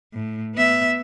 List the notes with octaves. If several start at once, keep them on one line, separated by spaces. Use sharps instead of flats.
A2
B3 E5